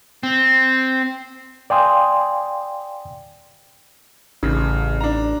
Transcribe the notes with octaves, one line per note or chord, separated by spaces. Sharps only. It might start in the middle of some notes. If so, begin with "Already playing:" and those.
C4
D5 F5 G5 G#5 C6 D#6
A1 C#3
D4 A#5